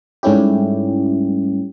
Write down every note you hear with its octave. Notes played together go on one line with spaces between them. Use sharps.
G#2 G3 A3 C#4 E4 G4